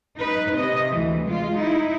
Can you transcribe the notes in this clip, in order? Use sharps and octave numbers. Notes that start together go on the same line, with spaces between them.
D#4 B4
C3 D#5
D2 E3
G#3 F4
D#4 E4